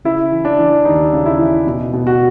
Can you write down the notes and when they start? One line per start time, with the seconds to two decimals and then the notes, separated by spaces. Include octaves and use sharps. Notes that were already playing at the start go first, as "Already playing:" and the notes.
0.05 C#3 E4
0.32 E3
0.45 D4
0.58 E3
0.85 D#2 D#4
1.13 C#3
1.26 E4
1.39 E3
1.67 B2
1.93 B2
2.07 F#4